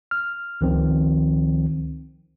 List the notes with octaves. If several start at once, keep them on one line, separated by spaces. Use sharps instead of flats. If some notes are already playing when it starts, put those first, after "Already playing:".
F6
C#2 D#3 F3 C4